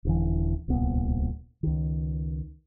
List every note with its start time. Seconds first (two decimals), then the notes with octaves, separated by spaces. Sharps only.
0.05 D#1 D3 E3
0.68 D1 C2 A#2 B3
1.63 C#2 D#3